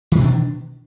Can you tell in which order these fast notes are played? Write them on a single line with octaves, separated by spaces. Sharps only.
D#3 E3 B2 D4